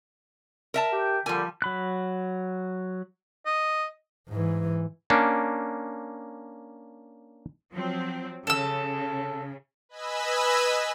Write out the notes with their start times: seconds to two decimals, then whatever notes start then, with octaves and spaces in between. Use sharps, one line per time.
0.74 A#4 E5 A5
0.92 G4 G5
1.26 A#2 D3 F3 G3 G#5
1.62 F#3 B5 F#6
3.46 D#5
4.29 G#2 E3
5.10 A#3 C#4 D4
7.71 F3 F#3 C4
8.47 C#3 A4 E6
9.89 B4 D#5 G#5 B5 E6